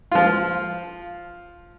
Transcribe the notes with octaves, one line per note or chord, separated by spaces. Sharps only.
F3 F4